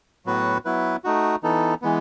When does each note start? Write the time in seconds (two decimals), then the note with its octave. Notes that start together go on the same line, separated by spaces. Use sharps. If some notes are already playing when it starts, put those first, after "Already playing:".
0.26 A2 F#3 B3 F#4 B4
0.65 F#3 B3 E4 B4
1.04 A3 D#4 F#4
1.43 E3 B3 D#4 A4
1.82 E3 G#3 B3